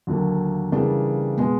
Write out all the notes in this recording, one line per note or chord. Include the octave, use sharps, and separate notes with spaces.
D#2 D3 F#3 A#3
C#3 E3 G3 A#3 D4
B2 G#3 B3